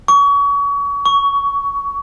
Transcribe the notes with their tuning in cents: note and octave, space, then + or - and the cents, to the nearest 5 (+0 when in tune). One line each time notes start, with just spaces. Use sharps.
C#6 +35
C#6 +20